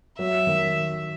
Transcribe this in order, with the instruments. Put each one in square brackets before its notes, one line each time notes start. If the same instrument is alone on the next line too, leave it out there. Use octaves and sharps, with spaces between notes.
[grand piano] F#3 [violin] E5
[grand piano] D#3